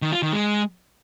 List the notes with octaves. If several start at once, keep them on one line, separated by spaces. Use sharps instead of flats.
D#3
F4
D#3
G#3